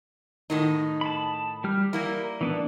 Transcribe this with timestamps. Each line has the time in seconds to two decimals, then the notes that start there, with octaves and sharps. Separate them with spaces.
0.50 A2 D#3 D#4
1.01 A5 B5
1.64 G3 G4 F6
1.93 G3 A#3 E4 A#4
2.41 E3 B3 D4